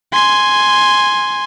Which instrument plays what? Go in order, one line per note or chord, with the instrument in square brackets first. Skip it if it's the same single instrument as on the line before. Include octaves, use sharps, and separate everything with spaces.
[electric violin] G#5 C6